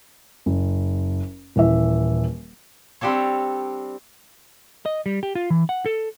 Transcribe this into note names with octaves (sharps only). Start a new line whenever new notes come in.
F#1
D#1 E3 E5
G3 C4 D4 G4 A4 C#5
D#5
G3
G4
F4
E3
F#5
A4